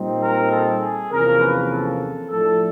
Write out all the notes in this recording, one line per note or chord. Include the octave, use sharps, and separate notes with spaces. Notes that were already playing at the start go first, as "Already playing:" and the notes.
Already playing: A#2 G3 C4 D#4
A#4
A4
G#4
E2 C3 F3 A#3 C#4 A#4
B4
A4
A2 F3 A3 D4 A4